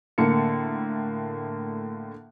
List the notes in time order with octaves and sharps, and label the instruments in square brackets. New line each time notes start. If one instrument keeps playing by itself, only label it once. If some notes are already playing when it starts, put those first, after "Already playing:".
[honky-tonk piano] A2 D3 A#3 C#7